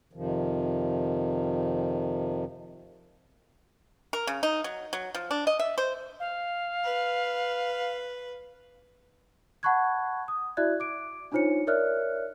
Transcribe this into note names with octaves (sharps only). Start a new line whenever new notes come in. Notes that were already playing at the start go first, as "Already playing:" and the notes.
F2 C3 D#3 F3
A#4
C#3
D#4
F#3
F#3
F3
D4
D#5
E5
C5
F5
B4
F#5 A5 B5 C#6 F#6 G#6
D#6
E4 F#4 D5 E5 F#6 G#6
D6 D7
D4 D#4 F4 C5 C#5 C#7
A#4 C#5 D5 E5 F6 F#6